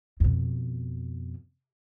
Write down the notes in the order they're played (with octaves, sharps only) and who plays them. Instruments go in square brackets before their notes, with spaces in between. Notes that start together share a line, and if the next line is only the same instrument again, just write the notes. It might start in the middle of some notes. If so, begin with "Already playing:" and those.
[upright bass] F2 B2